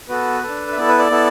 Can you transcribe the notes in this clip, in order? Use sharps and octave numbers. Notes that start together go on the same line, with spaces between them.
B3 F#4 A4 B4
D4 A4
E5
B3 E4 A4 D5
B4
D5
B3 E4 A4